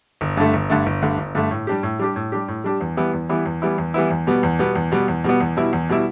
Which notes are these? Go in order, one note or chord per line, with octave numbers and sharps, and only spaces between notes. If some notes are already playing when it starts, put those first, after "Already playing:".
G1
G2 D3 A3
G1
G2 D3 A3
G1
G2 D3 A3
G1
G2 D3 A3
A2
G3 D4 G4
A2
G3 D4 G4
A2
G3 D4 G4
A2
G3 D4 G4
E2
E3 G3 B3 E4
E2
E3 G3 B3 E4
E2
E3 G3 B3 E4
E2
E3 G3 B3 E4
E2
B2 G3 B3
E2
B2 G3 B3
E2
B2 G3 B3
E2
B2 G3 B3
E2
B2 G3 E4
E2
B2 G3 E4